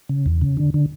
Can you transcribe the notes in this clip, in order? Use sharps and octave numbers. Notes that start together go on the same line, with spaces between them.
C#3
E2
C#3
D3
D3